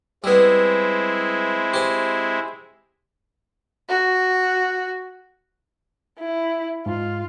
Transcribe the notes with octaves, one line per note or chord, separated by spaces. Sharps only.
G3 G#3 B3 C4 E4
G4 C5
F#4
E4
G#2 F4